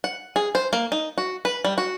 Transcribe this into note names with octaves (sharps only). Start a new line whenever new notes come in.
F#5
G#4
C5
A#3
D#4
F#4
B4
G3
F#4